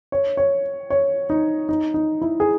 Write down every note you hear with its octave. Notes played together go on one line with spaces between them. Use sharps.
C#5
C#5
C#5
D#4
D#4
D#4
E4
G#4